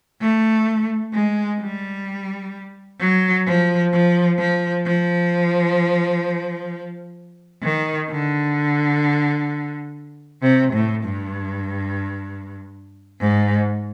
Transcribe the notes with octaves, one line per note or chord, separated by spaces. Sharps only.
A3
G#3
G3
F#3
F3
F3
F3
F3
D#3
D3
C3
A2
G2
G#2